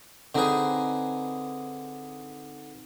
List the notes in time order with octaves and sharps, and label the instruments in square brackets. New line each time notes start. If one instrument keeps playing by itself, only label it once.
[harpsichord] D3 G#4 [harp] C4 D#4 B4